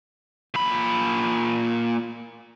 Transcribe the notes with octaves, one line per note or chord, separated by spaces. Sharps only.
A#2 B5